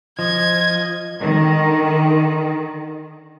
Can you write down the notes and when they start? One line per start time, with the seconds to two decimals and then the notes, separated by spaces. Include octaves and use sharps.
0.19 F3 D#5 G#6
1.16 D3 D#3